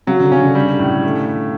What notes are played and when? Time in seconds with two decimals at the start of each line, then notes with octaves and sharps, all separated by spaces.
0.07 C#3 F#3
0.20 D3
0.31 C#3 C#4
0.44 D3
0.55 G3
0.79 A2
1.03 A3